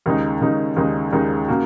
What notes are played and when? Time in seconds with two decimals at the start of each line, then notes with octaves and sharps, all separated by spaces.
0.06 D#2 C#3 G#3 D#4
0.41 D#2 C#3 G#3 D#4
0.76 D#2 C#3 G#3 D#4
1.12 D#2 C#3 G#3 D#4
1.48 C#3 A#3 F#4